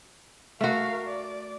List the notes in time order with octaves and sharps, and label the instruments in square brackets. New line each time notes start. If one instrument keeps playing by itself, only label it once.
[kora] A3 F#4 [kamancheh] A#4 F5
[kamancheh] D5